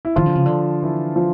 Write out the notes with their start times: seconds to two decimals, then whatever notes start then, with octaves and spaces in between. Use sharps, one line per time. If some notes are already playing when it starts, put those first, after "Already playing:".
0.05 E4
0.16 D#3 F3 F4
0.26 D3
0.35 C#3
0.46 D3
0.83 E3 E4
1.16 F3 F4